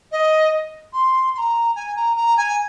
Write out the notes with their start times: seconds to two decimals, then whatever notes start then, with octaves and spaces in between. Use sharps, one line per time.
0.12 D#5
0.93 C6
1.34 C6
1.38 A#5
1.76 G#5
1.96 A#5
2.17 A#5
2.37 G#5